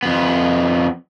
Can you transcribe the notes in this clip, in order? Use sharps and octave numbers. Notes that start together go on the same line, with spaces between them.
F2 B3